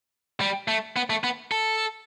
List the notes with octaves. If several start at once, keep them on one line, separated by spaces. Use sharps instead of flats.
G3
A3
B3
A3
B3
A4